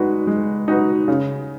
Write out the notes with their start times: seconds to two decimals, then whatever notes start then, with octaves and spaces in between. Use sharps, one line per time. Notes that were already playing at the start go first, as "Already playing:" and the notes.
Already playing: G#3 D#4 F#4 B4
0.27 G#3
0.68 D#4 F#4 B4
1.08 C#3